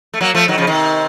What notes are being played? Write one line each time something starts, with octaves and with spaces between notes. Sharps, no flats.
A3
F#3 A#3
F3 A3
D#3 F#3
C#3 F3
C3 D#3